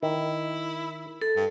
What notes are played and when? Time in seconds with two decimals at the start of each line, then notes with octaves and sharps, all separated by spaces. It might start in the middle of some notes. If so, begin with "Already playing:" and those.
0.03 D#3 E4
1.21 A4
1.36 G2